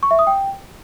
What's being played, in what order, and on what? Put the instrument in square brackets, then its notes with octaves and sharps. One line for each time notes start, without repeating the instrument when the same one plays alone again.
[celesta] C#6
E5
D#6
G5